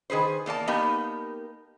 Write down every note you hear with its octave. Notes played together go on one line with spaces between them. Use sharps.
D#3 G#4 B4 C5
E2 A#3 D5 A5
A#3 B3 D#4 G4 A#4